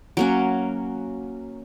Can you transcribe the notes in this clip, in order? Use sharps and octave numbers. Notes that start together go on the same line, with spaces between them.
F#3 A#3 C#4